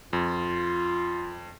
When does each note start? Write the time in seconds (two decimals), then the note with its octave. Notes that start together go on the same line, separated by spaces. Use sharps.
0.13 F2 F4